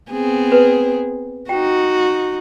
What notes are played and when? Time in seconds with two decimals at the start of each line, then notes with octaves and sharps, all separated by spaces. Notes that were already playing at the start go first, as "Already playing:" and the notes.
0.11 B3 C4 G#4
0.52 B4
1.49 D#4 F#4 G5